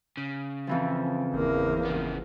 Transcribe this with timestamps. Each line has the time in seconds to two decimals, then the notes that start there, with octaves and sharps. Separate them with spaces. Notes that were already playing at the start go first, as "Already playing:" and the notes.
0.17 C#3
0.67 F2 E3 F3
1.33 G1 E2 A#3
1.85 C#3 B3